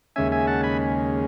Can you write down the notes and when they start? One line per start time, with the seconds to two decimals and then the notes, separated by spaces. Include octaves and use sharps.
0.16 D#2 C#3 G#3 C#4 E5 G#5
0.32 E5 G#5
0.47 F#5 A5
0.63 G#5 B5